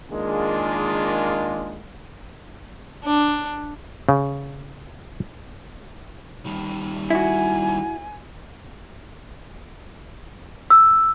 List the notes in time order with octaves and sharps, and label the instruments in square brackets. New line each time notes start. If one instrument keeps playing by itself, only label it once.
[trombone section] D#3 G#3 A#3 D4 F4 G#4
[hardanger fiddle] D4
[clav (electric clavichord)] C#3
[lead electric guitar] D#3 G3
[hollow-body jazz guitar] E4 F#4 [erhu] G#5
[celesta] E6